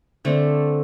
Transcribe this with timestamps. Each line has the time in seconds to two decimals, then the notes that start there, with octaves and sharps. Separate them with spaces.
0.25 D3 A3 C4